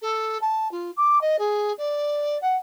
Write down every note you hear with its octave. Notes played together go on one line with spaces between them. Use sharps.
A4
A5
F4
D6
D#5
G#4
D5
F#5